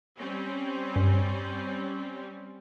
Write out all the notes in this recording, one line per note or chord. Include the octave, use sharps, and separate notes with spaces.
G3 C4 C#4
G2